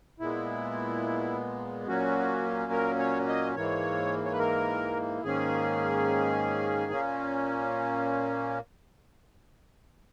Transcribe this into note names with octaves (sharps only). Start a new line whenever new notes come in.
A#2 G#3 B3 E4
A#2 F#3 A#3 C#4 F#4
A#4
C#5
D#5
G#2 E3 A#3 C#5
C#5
B4
A#4
G#2 D#3 A#3 C#4 G#4
A#2 A#3 C#4